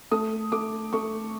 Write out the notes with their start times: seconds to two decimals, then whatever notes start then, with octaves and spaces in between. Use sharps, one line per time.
0.12 A3 D#6
0.52 A3 D6
0.93 A3 C#6